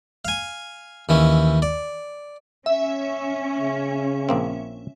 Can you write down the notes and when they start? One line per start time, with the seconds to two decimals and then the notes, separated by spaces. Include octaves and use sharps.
0.25 F5 G#5
1.09 D#2 E3 C#4
1.62 D5
2.66 C#4 E5
3.60 C#3
4.29 A#1 A#3 C4